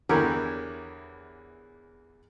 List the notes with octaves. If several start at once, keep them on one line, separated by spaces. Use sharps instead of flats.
E2 D3 E3 G4 A#4 C#5